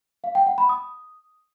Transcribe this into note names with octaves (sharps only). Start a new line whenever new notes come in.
F5
G5
F#5
B5
D#6